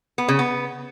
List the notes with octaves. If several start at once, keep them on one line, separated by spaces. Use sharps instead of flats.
B3
C#3
B3